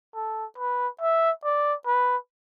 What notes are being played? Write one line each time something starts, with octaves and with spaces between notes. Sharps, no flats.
A4
B4
E5
D5
B4